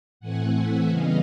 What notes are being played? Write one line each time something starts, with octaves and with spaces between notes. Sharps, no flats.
A2 E3 A3 C4 F#5 G#5
E5 F#5
C#3 E3 G3 B3 D#5 F5